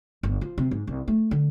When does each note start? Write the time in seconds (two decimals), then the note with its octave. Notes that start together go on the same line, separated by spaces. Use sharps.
0.23 G1
0.41 F3
0.58 C3
0.71 G#2
0.87 C2
1.08 A3
1.31 D3